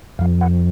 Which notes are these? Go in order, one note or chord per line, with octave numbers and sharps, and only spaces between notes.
F2 F3 F5
F#5